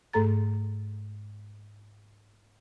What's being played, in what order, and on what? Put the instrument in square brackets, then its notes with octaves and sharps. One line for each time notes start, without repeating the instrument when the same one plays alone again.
[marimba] G#2 A3 A4 A#5 A6